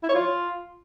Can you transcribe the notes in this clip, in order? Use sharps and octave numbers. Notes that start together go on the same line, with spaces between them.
E4
C#5
F4